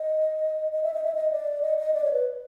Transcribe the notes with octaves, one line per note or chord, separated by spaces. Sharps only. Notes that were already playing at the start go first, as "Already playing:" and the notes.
Already playing: D#5
D#5
E5
D#5
E5
D#5
D5
D#5
D#5
D5
C#5
B4